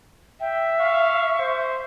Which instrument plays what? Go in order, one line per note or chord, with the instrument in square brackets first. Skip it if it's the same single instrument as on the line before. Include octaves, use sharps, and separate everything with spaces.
[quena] E5 [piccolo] G5
[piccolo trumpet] F5 [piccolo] C#6
[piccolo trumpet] C5